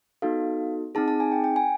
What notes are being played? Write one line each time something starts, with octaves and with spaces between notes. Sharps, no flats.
B3 D#4 F#4 A4 F5
C4 D#4 G#4 A5
A5
G#5
G5
G5
G#5